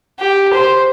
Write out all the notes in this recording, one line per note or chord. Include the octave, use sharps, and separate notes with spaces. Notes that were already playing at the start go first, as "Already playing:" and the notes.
G4
C5